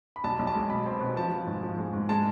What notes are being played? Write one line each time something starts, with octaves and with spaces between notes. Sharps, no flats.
B5
B1 A5
B1
A5
G#3
B2 B5
C4
B2
F3 A5
F3
G#2
F3
G#3
G#2
G#3 A5